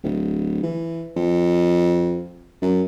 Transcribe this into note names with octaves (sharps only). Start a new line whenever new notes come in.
D1
E3
F2
F#2